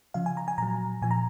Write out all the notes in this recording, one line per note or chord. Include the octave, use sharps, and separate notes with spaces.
C#3 F3 F5
G#5
A#5
G#5
A#2 F#3 A#5
A#2 F3 G#5
A#5